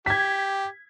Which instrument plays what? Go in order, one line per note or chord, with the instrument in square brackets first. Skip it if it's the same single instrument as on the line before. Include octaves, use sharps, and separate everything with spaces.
[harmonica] G4 [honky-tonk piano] G#6 B6